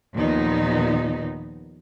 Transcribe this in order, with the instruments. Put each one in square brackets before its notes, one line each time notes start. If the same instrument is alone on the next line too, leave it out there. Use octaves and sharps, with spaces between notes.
[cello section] D#2 A#2 D#3 F3 B3 D#4